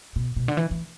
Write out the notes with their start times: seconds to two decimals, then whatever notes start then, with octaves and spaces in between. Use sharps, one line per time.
0.16 B2
0.36 B2
0.48 D3
0.57 E3
0.71 E3